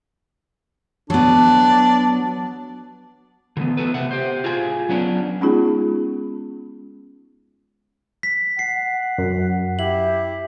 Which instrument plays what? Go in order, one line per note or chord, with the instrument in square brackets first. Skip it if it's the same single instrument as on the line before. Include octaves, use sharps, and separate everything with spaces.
[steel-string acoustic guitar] F#3 B3 [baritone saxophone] D4
[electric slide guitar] D3 E3 G#3 B3
B3 F#4 A4 B4
C3 E5 F#5
G4 C5
F4 F#4 G#4 G#5
F#3 B3 C#4 D4 F#4
[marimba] G#3 B3 C#4 D#4 F4 G#4
[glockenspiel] B6
[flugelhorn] F#5 [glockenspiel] C7
[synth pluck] F#2
[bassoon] E4 [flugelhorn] G4 [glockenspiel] F#7